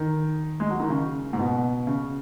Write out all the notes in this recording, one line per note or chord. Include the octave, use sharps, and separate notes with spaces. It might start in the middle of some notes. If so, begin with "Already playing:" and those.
Already playing: D#3
G#3
F#3
D#3
C#3
G#2
B2
C#3